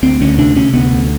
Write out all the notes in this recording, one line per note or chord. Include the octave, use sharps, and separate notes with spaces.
D2 C4
D2 C#4
C3 D4
C3 C#4
D2 B3
D2